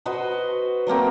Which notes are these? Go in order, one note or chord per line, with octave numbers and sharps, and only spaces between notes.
F#4 B4 C5 D#5
F#3 A3 A#3 C4